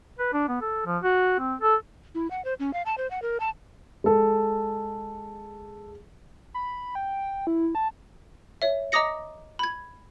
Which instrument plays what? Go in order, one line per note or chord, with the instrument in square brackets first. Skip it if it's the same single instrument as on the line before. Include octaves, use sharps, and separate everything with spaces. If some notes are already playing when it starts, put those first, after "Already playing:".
[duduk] B4
D4
B3
A4
F3
F#4
C4
A4
[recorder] E4
F#5
C5
C#4
F5
A5
C5
F#5
A#4
A5
[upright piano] G#3 A4
[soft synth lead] B5
G5
E4
A5
[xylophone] C#5 E5
D#5 A#5 D6 D#6 A#6 C#7
B5 G#6